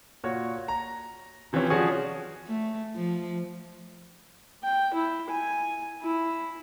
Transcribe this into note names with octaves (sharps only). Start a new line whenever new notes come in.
A#2 F#4 C#5
A#5
C3 E3 F3 C4 C#4
F3 G3 C#4 F#4 G#4 C#5
A3
F3
G5
E4
G#5
E4